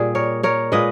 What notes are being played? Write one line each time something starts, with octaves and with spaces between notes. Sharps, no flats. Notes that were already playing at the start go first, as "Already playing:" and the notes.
Already playing: A#2 G3 G#4
A#4 C#5
A#4 C#5
A#2 G#3 B4 D#5